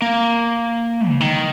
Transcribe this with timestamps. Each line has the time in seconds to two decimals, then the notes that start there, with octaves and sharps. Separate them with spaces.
0.02 A#3
1.10 C#3
1.20 D#3